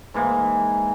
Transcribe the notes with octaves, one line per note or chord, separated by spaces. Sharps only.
G#2 E3 A#3